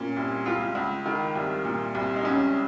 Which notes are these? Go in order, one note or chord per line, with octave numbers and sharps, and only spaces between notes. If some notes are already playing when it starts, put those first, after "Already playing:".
Already playing: A#2 C#4
C2
C#2 F4
C#2
D#3
C2
A#2
C2
D#4
C#2 C#4